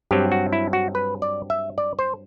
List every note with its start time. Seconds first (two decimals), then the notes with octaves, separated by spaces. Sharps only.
0.11 G2 F#3 C4 G4
0.32 F#4
0.53 E4
0.73 F#4
0.95 B4
1.22 D5
1.50 E5
1.78 D5
1.99 C5